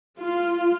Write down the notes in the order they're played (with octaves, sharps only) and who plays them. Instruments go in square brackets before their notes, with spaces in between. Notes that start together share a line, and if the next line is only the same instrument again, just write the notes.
[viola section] F4